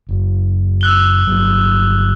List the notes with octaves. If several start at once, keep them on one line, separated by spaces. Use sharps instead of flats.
F#1
E6 F#6 G7
G1 F#3